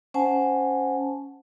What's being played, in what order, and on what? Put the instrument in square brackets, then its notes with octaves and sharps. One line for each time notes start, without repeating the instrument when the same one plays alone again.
[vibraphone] C#4 C5 F#5 G#5 A5